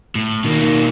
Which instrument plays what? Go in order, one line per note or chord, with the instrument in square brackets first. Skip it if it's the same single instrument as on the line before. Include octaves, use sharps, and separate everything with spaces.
[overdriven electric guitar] A2
[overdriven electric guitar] B2 A#3 [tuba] D#3